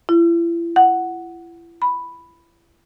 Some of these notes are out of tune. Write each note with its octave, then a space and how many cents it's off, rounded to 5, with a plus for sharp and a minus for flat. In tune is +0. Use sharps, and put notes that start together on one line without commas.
E4 +40
F#5 +5
B5 +0